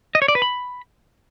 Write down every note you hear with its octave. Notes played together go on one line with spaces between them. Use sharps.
D#5
C#5
D5
B4
B5